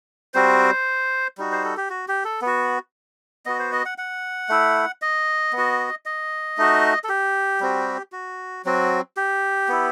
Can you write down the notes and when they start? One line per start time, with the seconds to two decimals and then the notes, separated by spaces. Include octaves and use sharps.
0.34 G3 C4 F#4 C5
1.38 G3 D#4 F#4
1.52 C5
1.65 A4
1.77 G4
1.90 F#4
2.08 G4
2.25 A4
2.42 B3 F#4
3.46 B3 F#4 D#5
3.59 C5
3.72 D#5
3.85 F#5
3.98 F#5
4.49 A3 E4
5.02 D#5
5.53 B3
5.58 F#4
6.06 D#5
6.58 A3 D#4 F#4
7.04 A4
7.09 G4
7.60 G3 C4 F#4
8.12 F#4
8.65 F#3 C4 F#4
9.17 G4
9.69 B3 E4